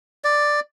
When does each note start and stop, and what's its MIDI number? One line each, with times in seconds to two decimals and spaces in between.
0.24 0.60 74